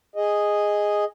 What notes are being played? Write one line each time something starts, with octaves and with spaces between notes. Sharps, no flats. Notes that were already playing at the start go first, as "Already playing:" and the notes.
G#4 D#5